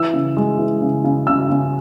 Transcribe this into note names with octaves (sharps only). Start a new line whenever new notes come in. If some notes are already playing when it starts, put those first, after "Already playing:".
Already playing: E3 E6
C#3
G#3
E3
C#3
C#3
C#3 E6
C#3